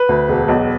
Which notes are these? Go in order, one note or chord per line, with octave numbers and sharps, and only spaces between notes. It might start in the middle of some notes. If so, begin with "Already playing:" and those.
Already playing: B4
D2
E1
B1